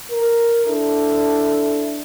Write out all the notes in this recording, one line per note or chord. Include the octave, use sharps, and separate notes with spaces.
A#4
D4 E4 A4